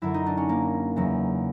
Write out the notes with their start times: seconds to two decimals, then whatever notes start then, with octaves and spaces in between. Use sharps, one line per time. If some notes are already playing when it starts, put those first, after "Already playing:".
0.02 F#2 D3 F#3 E4
0.14 D#4
0.26 D4
0.37 C#4
0.49 A#3
0.96 E2 C#3 F#3